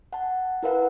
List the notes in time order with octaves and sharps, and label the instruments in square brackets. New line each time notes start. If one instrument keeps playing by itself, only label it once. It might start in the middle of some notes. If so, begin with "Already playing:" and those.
[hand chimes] F#5 A5
E4 A#4 B4 F5 F#5